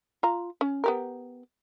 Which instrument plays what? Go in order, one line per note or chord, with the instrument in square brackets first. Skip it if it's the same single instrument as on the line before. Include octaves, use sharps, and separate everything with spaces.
[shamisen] F4 A#5
C#4
B3 G4 A#4